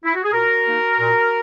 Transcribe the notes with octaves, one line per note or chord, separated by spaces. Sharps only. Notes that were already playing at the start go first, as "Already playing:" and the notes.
E4
F#4
G#4
A#2 F#4 A#4
A#3 D#4
A#2